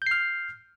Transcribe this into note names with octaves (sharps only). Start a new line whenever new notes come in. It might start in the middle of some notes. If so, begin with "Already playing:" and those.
F6 G6 C7